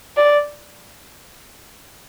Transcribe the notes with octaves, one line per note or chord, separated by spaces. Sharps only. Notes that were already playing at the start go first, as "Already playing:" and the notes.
D5